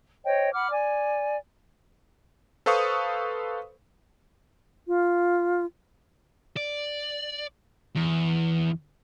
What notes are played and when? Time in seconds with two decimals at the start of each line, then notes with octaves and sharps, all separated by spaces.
0.25 C5 C#5 D#5 G5
0.54 F#5 B5 D6 F6
0.69 D5 G#5
2.66 A4 B4 C5 F5 C#6 D#6
4.87 F4
6.57 D5
7.96 E2